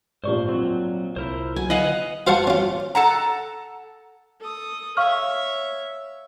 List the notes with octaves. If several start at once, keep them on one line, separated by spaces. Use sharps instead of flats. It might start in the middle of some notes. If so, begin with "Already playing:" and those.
A#1 G#2 C5 D5 C#6
F#3 C4
C2 E4 A#4 C5
F#3 G#5
B4 D#5 F5 F#5 G#5
F4 C5 F5 F#5 A5 C#6
C#4 F4
A4 F#5 A#5
A4 D#6
C#5 E5 F5 C#6 F6